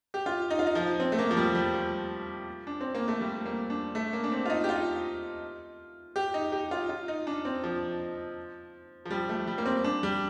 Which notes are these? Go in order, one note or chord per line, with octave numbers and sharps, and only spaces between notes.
G4
F4
D#4
F4
D#4
F3
C4
A3
A#3
F3
G3
G3
F3
D4
C4
A#3
A3
G3
A#3
D4
A3
A#3
D4
C4
F4
D#4
G4
F4
G4
D#4
G4
F4
F4
D#4
D4
C4
F3
F3
G3
A3
G3
A#3
C4
D4
G3